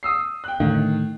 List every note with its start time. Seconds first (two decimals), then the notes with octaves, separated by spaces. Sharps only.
0.03 D#6 E6 C7
0.44 G5 F#6
0.60 A2 D3 D#3